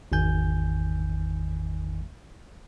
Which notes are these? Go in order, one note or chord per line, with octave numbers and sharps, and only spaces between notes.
G#1 E2 D#3 G#5 G6